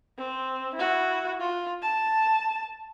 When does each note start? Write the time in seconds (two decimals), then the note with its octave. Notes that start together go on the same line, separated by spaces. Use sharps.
0.18 C4
0.75 E4 F#4
1.40 F4
1.82 A5